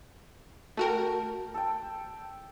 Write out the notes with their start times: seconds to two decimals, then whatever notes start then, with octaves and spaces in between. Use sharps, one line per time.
0.77 A3 F#4 A#4 G5 A5
1.54 A4 G5